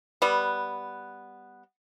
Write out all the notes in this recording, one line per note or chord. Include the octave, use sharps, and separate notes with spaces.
G3 B3